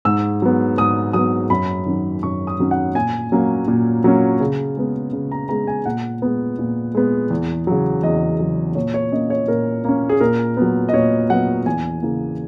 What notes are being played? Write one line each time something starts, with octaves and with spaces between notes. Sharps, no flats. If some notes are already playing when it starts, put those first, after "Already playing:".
G#2 E6
F#3 B3
G#2 D#6
F#3 B3 D#6
F#2 B5
D#3 F#3 C#4
F#2 C#6
D#6
D#3 F#3 C#4
F#5
A#2 G#5
F#3 A#3 C#4
A#2
F#3 A#3 C#4
C#3
G#3 B3
C#3
A#5
G#3 B3 A#5
G#5
A#2 F#5
G#3 B3
A#2
G#3 B3
E2
C#3 F#3
E2 D#5
C#3 F#3
A#2 C#5
C#5
A#3 C#4 D#5
C#5
A#2 A#4
A#3 C#4
G#4
A#2 A#4
F#3 B3
D#5
A#2 C#5
F#3 B3 F#5
E2 G#5
C#3 E3 A#3